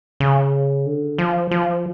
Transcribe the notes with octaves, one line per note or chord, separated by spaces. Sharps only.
C#3
D3
F3
F3